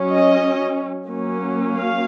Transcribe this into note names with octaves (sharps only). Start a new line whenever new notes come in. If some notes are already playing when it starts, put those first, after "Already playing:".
Already playing: F#3 C#4
D#5
F#3 A#3 C#4
F5